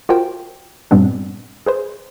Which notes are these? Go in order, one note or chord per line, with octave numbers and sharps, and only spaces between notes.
F4 F#4 A#4 C5 G5
G2 A#2 G3 B3 C4 D4
G#4 B4 C5